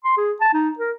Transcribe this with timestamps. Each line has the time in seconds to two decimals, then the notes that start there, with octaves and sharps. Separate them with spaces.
0.05 C6
0.17 G#4
0.41 A5
0.53 D#4
0.79 A#4